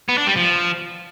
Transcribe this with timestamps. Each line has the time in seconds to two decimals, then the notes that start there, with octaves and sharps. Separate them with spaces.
0.09 B3
0.18 D4
0.27 G3
0.36 F3